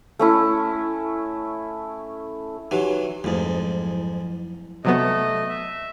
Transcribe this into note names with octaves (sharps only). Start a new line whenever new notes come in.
A3 C#4 E4
E3 F#3 D#4 G4
F2 G#2 F#3 A3 E4
C3 F#3 A3 B3 D#5
E5